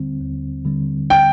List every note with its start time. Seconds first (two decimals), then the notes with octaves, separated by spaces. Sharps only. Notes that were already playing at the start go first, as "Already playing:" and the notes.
Already playing: D#2 D3 G3 C4
0.20 D#2
0.65 D3 G3 C4
1.10 G5